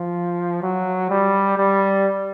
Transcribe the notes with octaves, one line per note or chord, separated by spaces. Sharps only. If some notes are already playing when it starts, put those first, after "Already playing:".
Already playing: F3
F#3
G3
G3